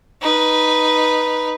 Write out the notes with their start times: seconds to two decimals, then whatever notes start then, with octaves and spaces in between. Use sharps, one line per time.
0.22 D#4 B4